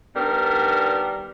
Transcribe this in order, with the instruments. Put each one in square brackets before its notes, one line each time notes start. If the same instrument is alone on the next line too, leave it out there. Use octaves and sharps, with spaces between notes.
[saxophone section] D#3 G3 B3 D4 A#4